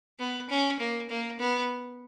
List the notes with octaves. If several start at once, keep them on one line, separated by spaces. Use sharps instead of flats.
B3
C#4
A#3
A#3
B3